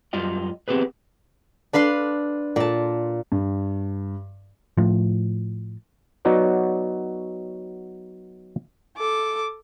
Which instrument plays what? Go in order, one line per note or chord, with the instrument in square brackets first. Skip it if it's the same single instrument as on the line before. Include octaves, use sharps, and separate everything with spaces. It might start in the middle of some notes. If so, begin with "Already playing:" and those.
[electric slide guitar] F#2 G3 F4 D#5 G5
B3 C4 G4 G#4 B4
[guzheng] D4 B4 F5 C6
A#2 A5
[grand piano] G2
[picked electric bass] A2 F3
[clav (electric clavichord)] F#3 B3 D#4 F#4 C#5 D5
[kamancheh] A4 D6